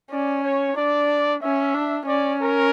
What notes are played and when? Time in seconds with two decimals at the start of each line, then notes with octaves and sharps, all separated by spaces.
0.11 C#4 D5
0.44 C#5
0.77 D4 D5
1.42 C#4 E5
1.74 D4
2.07 C#4 D5
2.40 A#4